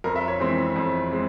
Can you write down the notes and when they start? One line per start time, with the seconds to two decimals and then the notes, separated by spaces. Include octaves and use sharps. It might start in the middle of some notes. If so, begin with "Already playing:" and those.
0.04 F2 A#4
0.16 E5
0.28 C#5
0.40 E3 G#3 C4
0.76 F2
1.12 G#3 C4